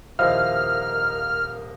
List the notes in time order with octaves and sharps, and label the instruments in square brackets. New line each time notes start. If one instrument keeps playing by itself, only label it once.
[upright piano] D#1 D#5 F5 [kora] F3 E4 [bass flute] A#4 [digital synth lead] F6